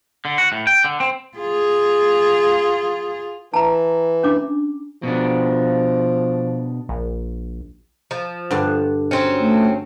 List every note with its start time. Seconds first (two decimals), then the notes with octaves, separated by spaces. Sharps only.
0.25 D3
0.38 F#4
0.52 A2
0.67 G5
0.84 D3
1.00 C4
1.38 F4 G#4
3.54 E3 A5 A#5
4.23 C#4 D4 D6
5.03 B2 F3 D4
6.89 A#1
8.11 F3
8.51 G2 D3
9.11 F#3 C4 C#4
9.40 A3